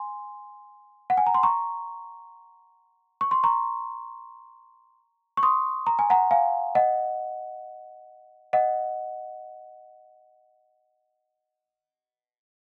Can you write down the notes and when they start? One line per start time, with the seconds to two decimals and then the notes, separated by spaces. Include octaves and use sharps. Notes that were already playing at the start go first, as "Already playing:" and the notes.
Already playing: G#5 C6
1.10 F#5
1.17 G#5
1.27 A#5
1.34 C6
1.43 A#5 C#6
3.21 C#6
3.31 C6
3.44 A#5 C#6
5.37 C#6
5.43 C6 D#6
5.87 A#5
5.99 G#5
6.10 F#5 A#5
6.31 F5 G#5
6.75 D#5 F#5
8.53 D#5 F#5